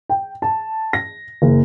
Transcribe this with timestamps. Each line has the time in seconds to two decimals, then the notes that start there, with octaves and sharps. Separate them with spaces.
0.10 G5
0.42 A5
0.93 A#6
1.42 F#1